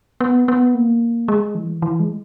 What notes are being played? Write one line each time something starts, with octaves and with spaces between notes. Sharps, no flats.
B3
B3
A#3
G#3
E3
E3
G#3